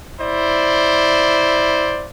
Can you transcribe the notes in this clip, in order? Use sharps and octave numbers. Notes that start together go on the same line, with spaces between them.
E4 C5 D5